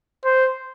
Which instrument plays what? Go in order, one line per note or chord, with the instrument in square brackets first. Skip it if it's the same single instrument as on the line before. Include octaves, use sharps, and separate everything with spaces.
[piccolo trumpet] C5